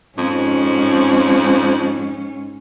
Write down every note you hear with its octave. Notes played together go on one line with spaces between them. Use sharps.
F2 G#2 C#4